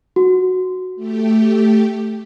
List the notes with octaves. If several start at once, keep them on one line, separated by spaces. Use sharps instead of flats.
F#4
A3 G4